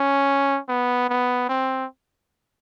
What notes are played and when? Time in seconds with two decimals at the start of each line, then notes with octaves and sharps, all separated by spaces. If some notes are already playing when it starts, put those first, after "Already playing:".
Already playing: C#4
0.68 B3
1.09 B3
1.49 C4